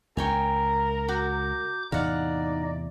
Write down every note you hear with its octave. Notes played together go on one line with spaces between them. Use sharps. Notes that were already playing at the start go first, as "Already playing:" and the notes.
C#2 A#4 C#5 G5 G#5 A#5
F#4 D6 G6
E2 A2 C3 D#4 D5 D#5 F5 F#5